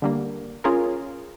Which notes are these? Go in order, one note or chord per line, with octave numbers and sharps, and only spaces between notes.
D3 G3 A#3
C#4 F4 G#4 A#4